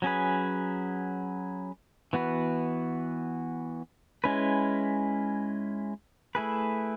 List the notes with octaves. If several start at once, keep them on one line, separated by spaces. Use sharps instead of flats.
F#3 C#4 G#4 B4
E3 B3 F#4 B4
G#3 C#4 E4 B4
A3 E4 G#4 B4